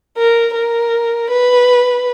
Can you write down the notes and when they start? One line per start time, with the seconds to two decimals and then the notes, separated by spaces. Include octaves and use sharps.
0.17 A#4
0.55 A#4
1.30 B4